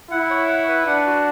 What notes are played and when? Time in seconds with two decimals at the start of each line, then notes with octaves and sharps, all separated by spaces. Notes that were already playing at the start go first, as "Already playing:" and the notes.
0.11 E4 F#5
0.30 C#5
0.49 F#5
0.69 B4
0.87 D4 F#5
1.06 F#4